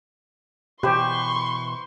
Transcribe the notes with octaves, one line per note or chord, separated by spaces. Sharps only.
B2 E3 G4 B4 C5 C6 C#6